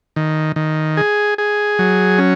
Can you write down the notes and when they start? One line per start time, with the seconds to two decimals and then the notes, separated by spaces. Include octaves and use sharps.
0.16 D#3
0.56 D#3
0.97 G#4
1.38 G#4
1.79 F#3
2.18 C#4